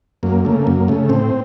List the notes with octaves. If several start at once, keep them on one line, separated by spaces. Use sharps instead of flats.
F#2 A#3
C#3 A3
F#2
C#3 A3
A2 C4